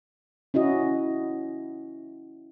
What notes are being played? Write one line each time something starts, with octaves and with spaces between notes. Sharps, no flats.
C#4 E4 F#4 D#5